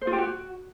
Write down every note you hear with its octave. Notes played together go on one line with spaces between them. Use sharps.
C5
F4
G4
F#4